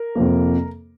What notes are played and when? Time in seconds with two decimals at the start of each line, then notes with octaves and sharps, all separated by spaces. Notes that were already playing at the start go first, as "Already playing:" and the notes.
Already playing: A#4
0.15 F2 C3 F3 A#3